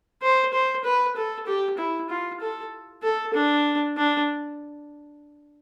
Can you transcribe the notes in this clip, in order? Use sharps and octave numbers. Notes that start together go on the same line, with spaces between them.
C5
C5
B4
A4
G4
E4
F4
A4
A4
D4
D4